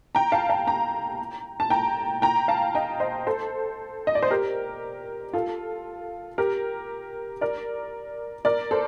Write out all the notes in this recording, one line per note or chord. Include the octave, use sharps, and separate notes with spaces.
G5 A#5
F5 A5
F5 A5
G5 A#5
A5
G5 A#5
G5 A#5
F5 A5
D#5 G5
C5 D#5
A4 C5
D#5
D5
C5
G4 A#4
F4 A4
G4 A#4
A#4 D5
A#4 D5
A4 C5